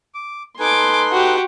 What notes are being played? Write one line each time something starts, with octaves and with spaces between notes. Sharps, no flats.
D6
D#4 A4 B4 G#5 C6 D6
F#4 G4